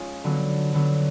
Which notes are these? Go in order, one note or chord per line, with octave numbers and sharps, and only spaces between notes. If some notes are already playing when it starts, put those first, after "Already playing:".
Already playing: G#3 C#4 F4
D3 F#3 B3
D3 F#3 B3